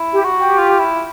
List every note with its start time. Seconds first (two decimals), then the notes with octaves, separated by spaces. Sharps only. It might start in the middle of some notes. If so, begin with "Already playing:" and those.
Already playing: E4
0.13 G4
0.25 F#4
0.36 G4
0.58 F4
0.79 E4